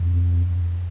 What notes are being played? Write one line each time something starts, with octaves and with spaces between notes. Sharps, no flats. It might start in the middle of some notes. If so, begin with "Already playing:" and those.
Already playing: F2